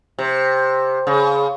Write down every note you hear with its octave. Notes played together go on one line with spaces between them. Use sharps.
C3
C#3